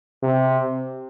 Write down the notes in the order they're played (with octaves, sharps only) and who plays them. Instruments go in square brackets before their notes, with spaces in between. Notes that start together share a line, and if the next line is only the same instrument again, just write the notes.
[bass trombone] C3